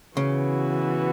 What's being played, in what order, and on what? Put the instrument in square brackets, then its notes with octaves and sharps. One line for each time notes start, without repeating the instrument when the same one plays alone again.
[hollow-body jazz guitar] C#3 [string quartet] E3 B3 F#4